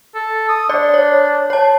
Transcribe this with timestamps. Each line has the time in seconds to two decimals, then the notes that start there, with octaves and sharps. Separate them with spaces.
0.15 A4
0.49 D#6
0.69 D4 D5
0.94 C#5
1.50 C#5 A5